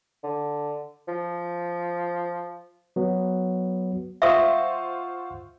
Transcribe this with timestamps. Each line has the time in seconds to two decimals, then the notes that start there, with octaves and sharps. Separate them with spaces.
0.23 D3
1.08 F3
2.96 F#3 B3
4.22 F4 C5 E5 F#5 C#6 D#6 E6